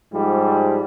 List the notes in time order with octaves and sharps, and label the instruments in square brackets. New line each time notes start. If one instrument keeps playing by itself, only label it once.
[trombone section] G#2 F3 G3